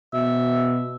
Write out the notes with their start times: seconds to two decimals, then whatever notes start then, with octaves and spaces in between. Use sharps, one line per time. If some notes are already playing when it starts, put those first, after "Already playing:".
0.13 B2 E5